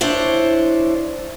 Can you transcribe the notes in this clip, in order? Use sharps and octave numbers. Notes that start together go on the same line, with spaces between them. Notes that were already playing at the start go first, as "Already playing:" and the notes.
D4 E4 C5 C#5